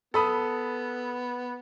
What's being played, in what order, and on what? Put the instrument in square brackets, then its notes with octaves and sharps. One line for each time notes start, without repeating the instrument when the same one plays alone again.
[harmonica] B3 [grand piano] A4 B5 D#6